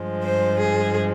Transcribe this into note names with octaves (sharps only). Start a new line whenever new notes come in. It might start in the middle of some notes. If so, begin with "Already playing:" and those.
Already playing: G2 F3 G#3
C5
G#4